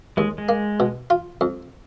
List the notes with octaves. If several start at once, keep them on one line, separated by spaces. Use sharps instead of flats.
D#2 G#3
G#3
A#3
B2
F4
F2